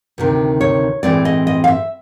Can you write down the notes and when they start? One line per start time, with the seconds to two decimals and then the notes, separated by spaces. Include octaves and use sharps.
0.18 D2 C3 D#3
0.61 C#5
1.03 A2 E3 G#3 C4 D5
1.25 D#5
1.47 D#5
1.64 F5
1.68 E5